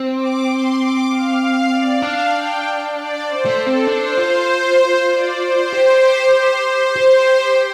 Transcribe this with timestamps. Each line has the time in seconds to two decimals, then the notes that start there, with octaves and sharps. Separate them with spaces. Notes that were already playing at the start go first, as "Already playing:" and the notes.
Already playing: C4
0.17 D6
0.48 C6
0.78 D6
1.09 F5
1.40 F5
1.71 D5
2.02 D4 F5
2.33 G5
2.95 D5
3.26 C5
3.45 A3
3.57 A4
3.67 C4
3.87 D4 C5
4.17 F4
5.11 D5
5.41 C5
5.73 G4
6.34 C5
6.65 C5
6.96 G4